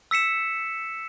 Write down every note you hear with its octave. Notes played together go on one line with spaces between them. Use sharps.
E6 B6 C#7 E7